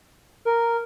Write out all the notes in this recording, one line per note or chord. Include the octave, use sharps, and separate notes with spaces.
A#4